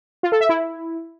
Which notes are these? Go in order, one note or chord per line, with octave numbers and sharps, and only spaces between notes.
F4
A4
E5
E4